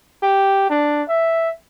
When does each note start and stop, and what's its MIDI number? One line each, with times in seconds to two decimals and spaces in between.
0.23 0.68 67
0.70 1.02 62
1.09 1.52 76